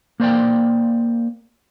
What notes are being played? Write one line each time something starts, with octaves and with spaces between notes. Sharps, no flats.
A#3 C5 D5 G5